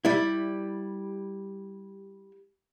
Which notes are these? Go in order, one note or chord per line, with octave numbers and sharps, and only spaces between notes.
G3 E4